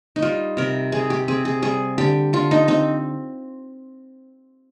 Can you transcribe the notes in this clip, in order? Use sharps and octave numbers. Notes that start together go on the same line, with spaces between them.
D#4
G3 F4
C3 A#4
C3 G#4
G4
C4 G#4
G#4
G3 G#4
D3 G4
D3 F4
D#4
C4 D#4